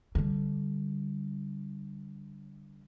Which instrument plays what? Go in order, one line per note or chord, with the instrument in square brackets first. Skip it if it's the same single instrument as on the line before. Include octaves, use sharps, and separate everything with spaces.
[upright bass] D3 G3